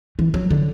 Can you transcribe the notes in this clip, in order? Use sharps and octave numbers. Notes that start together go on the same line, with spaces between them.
E3
F#3
D3